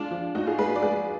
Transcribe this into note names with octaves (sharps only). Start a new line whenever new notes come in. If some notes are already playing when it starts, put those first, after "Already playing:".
Already playing: G#3 D4 F4
F3
G#2 D#4 F#4
F4 G#4
G#2 G#4 B4
D5
G#3 G#4 B4